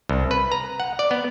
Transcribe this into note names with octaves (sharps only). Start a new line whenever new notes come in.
C2
B4
A#5
F#5
D5
B3